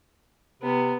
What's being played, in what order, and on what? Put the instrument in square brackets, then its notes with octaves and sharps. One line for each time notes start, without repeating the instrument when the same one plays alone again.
[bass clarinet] C3 [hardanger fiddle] B3